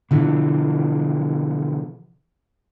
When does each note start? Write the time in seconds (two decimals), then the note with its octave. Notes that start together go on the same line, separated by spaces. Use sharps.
0.11 B2 D3 E3 F3